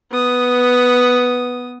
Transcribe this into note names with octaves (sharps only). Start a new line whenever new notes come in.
B3 D#6